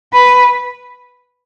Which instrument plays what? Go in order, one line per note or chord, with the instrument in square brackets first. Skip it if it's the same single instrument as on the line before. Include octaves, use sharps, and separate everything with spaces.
[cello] B4